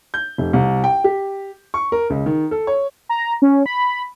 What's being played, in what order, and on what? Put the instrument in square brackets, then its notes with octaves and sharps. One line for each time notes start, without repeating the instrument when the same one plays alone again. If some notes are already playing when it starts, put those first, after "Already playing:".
[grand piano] G6
F1
C2
G5
G4
C#6
A#4
C#2
D#3
A4
C#5
[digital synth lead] A#5
C#4
B5